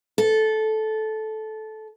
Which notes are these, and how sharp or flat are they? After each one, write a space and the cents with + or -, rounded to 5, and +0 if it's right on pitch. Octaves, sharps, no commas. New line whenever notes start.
A4 -15